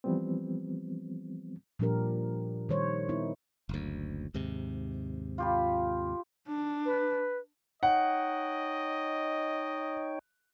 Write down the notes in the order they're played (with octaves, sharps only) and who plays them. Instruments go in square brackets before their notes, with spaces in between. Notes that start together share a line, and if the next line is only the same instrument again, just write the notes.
[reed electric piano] E3 F3 G3 B3 C4
[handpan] A#2 F3 G3 D4 G4 A#4
D#3 G3 C5 C#5
B3 D#4 E4
[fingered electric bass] F#1 D2
D#2 G#2 C3
[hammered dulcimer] F4 G4 B5
[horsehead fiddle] D4
[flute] B4
[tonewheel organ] D#4 C#5 G5 [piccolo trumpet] D#5 [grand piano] F#5